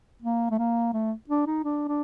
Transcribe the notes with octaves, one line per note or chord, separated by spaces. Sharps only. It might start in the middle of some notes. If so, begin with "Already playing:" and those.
A#3
A3
A#3
A3
D4
D#4
D4
D4